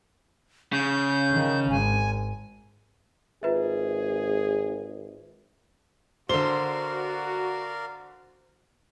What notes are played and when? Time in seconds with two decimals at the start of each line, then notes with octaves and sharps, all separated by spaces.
0.73 C#3 G6
1.31 D#3
1.70 G#1 G#5
3.43 G#1 F4 G#4 B4 E5
6.29 D3 F#4 A#4 C5 D5 F5 G7